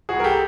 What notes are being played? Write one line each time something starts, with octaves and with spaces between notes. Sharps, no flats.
C2 F#4 G#4
A#4
G4 A4